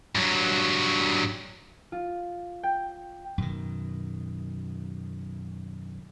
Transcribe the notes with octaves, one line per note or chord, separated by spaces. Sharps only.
G2 F#3
F4
G5
F#2 B2 D#3